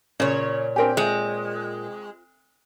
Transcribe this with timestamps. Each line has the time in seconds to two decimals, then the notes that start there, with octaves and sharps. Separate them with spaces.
0.20 A#2 C#3 C#5
0.76 C4 D4 G4 A#4 G#5
0.97 G#3 F4 C5